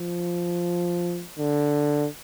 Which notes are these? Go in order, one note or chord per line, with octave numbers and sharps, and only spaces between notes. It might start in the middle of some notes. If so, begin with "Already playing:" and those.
Already playing: F3
D3